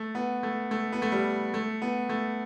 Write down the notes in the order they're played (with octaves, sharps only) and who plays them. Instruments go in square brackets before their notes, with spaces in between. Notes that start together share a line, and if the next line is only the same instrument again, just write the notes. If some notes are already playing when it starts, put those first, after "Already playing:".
Already playing: [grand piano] A3
B3
A3
A3
B3
A3
G3
A3
B3
A3